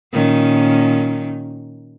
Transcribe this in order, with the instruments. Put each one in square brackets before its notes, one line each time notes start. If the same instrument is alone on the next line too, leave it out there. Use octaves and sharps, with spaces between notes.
[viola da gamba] A#2 D#3 C#4